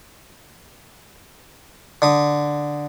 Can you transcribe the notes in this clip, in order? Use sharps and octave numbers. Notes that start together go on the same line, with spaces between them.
D3 D#6